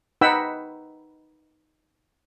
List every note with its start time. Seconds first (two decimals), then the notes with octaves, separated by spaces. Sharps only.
0.21 D#4 B4 F#5 G5 B5 E6